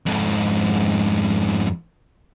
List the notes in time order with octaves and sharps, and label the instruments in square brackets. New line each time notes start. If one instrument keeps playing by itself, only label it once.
[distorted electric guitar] F2 G#2